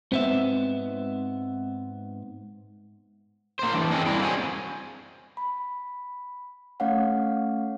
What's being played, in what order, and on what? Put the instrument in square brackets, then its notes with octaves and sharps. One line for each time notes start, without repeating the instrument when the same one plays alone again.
[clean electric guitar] G#2 B3 E5 [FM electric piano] C4
[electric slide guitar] A#3 C5
E3 D4
C4 C#4 G#4 D#5
G3 G#3 A#3 D4 E4
C4 F#4 G#4 C5 G#5
[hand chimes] B5
A3 C#4 C#5 F5 F#5